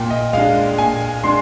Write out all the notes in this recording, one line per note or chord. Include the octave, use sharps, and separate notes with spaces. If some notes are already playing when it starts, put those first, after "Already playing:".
Already playing: A#2 G5
D#5
G#3 D4 F5
A#2 G#5
G#3 D4 C6